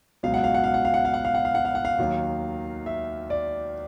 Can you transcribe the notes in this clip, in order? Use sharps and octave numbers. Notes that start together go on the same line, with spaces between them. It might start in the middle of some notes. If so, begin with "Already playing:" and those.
C#2 B2 F#3 F5
F#5
F5
F#5
F5
F#5
F5
F#5
F5
F#5
F5
F#5
F5
F#5
F5
F#5
F5
D#2 D#3 F#3
E5
D5